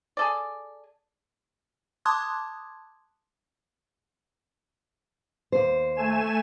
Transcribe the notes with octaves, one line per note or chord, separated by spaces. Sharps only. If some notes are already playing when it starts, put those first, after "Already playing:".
G#4 A4 D5
A5 C6 D6 D#6 F#6 G#6
D#2 C5
A3 G#5 E7